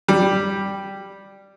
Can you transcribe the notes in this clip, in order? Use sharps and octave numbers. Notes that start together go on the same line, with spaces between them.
G3